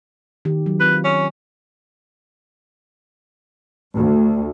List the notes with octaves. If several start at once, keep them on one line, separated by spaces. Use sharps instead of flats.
D#3 G4
F#3
C4 F4 B4
C#4
D2